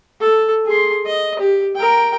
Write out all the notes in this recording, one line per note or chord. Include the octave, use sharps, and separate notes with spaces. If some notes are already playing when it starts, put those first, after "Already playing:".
A4
G#4 C6
D#5
G4
A#4 G5